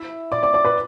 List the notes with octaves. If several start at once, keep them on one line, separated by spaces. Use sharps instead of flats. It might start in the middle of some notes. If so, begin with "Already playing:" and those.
Already playing: E4 E5
D5 D6
D5 D6
D5 D6
B4 B5